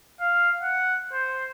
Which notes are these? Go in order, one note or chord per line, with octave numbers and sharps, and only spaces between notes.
F5
F#5
C5